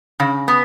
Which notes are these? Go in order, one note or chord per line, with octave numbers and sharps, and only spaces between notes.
C#3
B3